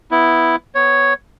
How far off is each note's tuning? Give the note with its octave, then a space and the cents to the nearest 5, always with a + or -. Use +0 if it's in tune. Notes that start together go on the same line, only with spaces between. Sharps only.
B3 +0 E4 +0
B3 +15 C#5 +0